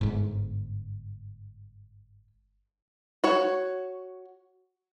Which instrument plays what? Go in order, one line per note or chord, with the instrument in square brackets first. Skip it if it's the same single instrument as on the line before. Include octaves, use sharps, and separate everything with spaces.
[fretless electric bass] G1 G#2
[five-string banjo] F#4 C#5